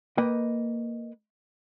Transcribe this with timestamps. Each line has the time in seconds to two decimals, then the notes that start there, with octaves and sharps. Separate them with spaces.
0.18 A#3 B4 D#5 G5